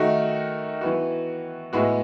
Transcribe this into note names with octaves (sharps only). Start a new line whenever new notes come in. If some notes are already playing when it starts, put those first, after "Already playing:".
Already playing: D#3 A3 D#4 F#4
E3 B3 F#4
A2 G#3 B3 F#4